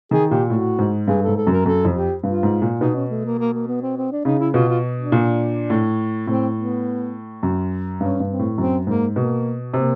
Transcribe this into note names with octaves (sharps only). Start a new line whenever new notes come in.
D#3 G#4
A#2 G4
A2 F#4
G#2
G2 G#4
G#2 A4
A4
F#2
A#4
F#2 A4
F2
G4
G2 F4
G#2
A#2
B2 D#4
C#4
A3
A#3
A#3
A#3
B3
C4
C4
D4
C#3 D#4
E4
B2 F4
F4
D4
A#2
A2
A2 C4
B3
F#2
G2 C#4
G2
C4
A2
F#2 C4
G#2 A#3
B2 A#3
C3 A#3